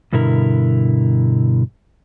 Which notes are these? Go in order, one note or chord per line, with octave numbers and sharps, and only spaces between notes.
G2 B2 D3 E4 A#4